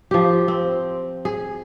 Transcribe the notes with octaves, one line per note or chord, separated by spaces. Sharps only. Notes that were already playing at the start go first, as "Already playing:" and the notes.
F3 G4
C4
G#4